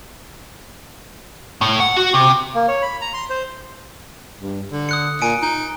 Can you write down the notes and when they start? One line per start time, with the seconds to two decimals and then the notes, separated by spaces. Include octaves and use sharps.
1.61 A2
1.80 F#5
1.96 F#4
2.14 C3
2.55 A#3
2.68 C#5
2.82 B5
3.01 A#5
3.14 C6
3.30 C5
4.41 G2
4.72 D3
4.89 D#6 F#6 C#7
5.22 A#2 G#5 C#7 D7
5.42 D#4